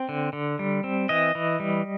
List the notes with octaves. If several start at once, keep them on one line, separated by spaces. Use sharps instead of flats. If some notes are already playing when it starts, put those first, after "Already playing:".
Already playing: C4
D3
D3
G3
C4
E3 D#5
E3
G3